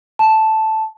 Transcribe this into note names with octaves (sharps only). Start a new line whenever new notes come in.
A5